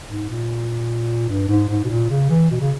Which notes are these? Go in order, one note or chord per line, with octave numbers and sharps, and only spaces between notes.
G#2
A#2
G2
G#2
G#2
B2
A#2
C#3
E3
B2
C#3